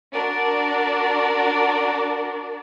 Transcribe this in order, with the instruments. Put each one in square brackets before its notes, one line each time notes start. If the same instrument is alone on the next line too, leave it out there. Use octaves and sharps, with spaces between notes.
[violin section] D4 F#4 A#4 D5